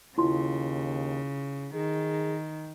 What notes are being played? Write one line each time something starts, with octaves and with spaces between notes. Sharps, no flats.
D#2 C#3 E4 F4 C6
D#3 G#4